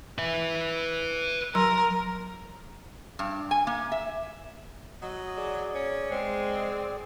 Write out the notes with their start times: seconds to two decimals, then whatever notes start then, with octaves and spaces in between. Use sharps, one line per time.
0.18 B4 E5
1.55 F#3 A#4 C6
3.19 G2
3.51 G#5
3.67 A#3
3.92 E5
5.02 F#3 D#5
5.38 G#4 D5
5.74 C#4
6.11 G#3 C4